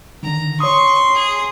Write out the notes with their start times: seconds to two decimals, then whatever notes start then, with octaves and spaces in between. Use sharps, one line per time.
0.23 D3 D#3 A#5
0.60 C#5 C6 C#6 D#6
1.15 G#4